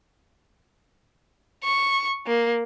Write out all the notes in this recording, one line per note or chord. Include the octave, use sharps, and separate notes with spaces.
C#6
A#3